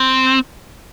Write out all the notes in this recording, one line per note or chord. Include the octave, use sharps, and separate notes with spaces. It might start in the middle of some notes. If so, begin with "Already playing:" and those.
Already playing: C4